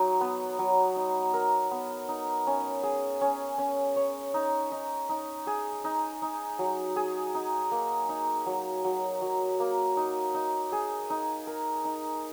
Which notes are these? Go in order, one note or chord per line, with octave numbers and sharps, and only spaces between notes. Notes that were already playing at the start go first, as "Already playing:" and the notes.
Already playing: F#3 D#4
B3
F#3
D#4
A#4
B3
D#4
C#4
G#4
C#4
C#4
C#5
D#4
D#4
D#4
G#4
D#4
D#4
F#3
G#4
D#4
A#3
D#4
F#3
F#3
F#3
A#3
D#4
D#4
G#4
D#4
A#4
D#4